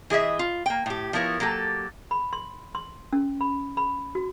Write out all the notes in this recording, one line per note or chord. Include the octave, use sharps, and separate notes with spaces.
E3 G#4 D#5 E5
F4
A#3 G5
A2 G4
F3 B3 E4 A#4 C#5
F#3 A#3 G4 A4
B5
C6
C6
C#4
B5
B5
F#4